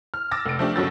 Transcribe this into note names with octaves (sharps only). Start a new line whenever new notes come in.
F6
D6 E6 A6 A#6
F1 D7
F3 A3 D4 G4
G1 D#2 C#3 F#3 E6 A6